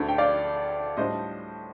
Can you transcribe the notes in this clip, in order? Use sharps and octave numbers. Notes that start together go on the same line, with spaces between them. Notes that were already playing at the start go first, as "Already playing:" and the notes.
Already playing: D2 D3 A3 D4
G5
D5 F5
A2 G3 D4 F4 C5 D#5